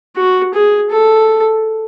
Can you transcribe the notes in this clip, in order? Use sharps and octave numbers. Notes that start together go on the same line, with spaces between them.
F#4
G#4
A4